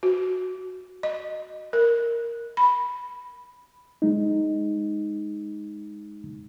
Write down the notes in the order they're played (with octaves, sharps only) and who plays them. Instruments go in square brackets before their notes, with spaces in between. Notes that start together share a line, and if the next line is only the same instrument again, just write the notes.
[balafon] F#4
D#5
A#4
B5
[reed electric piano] G#3 D#4